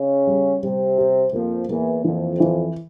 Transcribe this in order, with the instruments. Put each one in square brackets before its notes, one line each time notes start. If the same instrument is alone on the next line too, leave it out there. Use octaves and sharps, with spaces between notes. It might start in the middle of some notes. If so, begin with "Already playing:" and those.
Already playing: [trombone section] C#3 C#4
[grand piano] G3
[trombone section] C3 C4 [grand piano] G3
[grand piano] G4
[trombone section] F2 F3 [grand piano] A#3
[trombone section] E2 E3 [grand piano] A#3
[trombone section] F2 F3 [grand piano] E3
[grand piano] E3